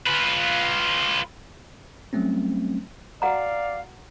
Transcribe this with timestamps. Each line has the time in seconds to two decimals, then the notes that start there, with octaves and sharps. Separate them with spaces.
0.07 F4 B4
2.13 F#3 G3 A3 C4 C#4
3.22 F#4 D5 F5 F#5 A#5